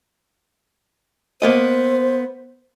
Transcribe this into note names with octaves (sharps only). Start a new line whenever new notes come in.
A#3 B3 C5 D#5